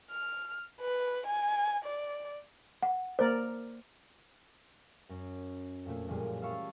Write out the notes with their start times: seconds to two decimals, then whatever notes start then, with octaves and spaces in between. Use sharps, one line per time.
0.11 F6
0.81 B4
1.27 G#5
1.85 D5
2.83 F#5
3.19 A#3 A#4 C5 D5
5.09 F#2
5.85 F2 A#2 A3
6.08 F#2 A#2 E3 F3 G3 G#3
6.42 E5 F5 G5 A5 B5 C#6